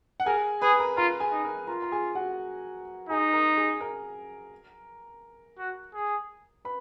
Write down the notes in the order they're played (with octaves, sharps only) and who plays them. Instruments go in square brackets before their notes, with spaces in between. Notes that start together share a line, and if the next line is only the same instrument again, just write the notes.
[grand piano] F#5
[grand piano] G#4 G#5 [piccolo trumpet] A#4
[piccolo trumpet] G#4 [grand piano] B4 B5
[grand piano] A#4 A#5
[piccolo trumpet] F4 [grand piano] A#4 A#5
[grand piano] G#4 G#5
[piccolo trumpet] D#4
[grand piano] A#4 A#5
[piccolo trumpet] F4 [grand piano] A#4 A#5
[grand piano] A#5
G#4 G#5
F#4 F#5
[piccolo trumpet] D#4 [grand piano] G#4 G#5
[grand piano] A#4 A#5
G#4 G#5
A#4 A#5
[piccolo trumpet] F#4
G#4
[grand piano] B4 B5